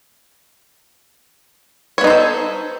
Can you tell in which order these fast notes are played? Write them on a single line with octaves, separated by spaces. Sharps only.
C#5 B3 D#4 C5 A4